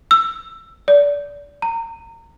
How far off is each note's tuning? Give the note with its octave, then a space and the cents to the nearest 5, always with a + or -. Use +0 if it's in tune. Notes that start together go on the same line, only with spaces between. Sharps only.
E6 +15
D5 -25
A#5 -25